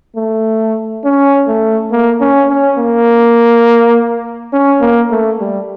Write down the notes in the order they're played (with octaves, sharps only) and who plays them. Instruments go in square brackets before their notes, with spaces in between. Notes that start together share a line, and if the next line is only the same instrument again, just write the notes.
[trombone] A3
C#4
A3
A#3
C#4
C#4
A#3
C#4
A#3
A3
G3